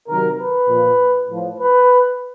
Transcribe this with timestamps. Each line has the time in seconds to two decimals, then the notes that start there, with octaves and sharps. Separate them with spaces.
0.08 C3 D#3 F#3 A#4
0.38 B4
0.68 A#2 F3
1.28 A2 F3
1.58 B4